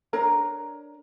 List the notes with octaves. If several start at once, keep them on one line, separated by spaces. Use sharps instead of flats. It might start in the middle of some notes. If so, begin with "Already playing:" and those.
D4 A#4 C#5 A#5